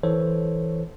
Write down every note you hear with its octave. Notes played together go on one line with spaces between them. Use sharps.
E3 A4 C5 C#5